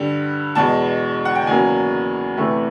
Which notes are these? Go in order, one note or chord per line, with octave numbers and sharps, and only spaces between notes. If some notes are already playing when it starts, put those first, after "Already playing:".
Already playing: G2 D3 G3
E2 B2 G#3 A5
F#5
G5
E2 C#3 F#3 A#3 G#5
E2 C3 E3 A3